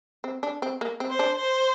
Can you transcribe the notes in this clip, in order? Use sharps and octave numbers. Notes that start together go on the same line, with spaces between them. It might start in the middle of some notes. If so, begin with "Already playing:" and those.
C4
D4
C4
A#3
C4
C5
D4
C5